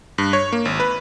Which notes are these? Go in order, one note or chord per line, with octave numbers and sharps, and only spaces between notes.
G2
C#5
A#3
G#1
B4